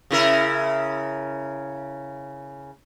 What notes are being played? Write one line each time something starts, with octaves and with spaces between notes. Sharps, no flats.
C#3 E4 A#4